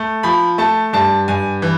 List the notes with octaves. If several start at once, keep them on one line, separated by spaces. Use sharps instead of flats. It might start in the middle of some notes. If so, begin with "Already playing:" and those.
Already playing: A3
F3 B5
A3 A5
G2 A5
G2 G#5
E3